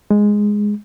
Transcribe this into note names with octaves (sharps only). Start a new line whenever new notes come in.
G#3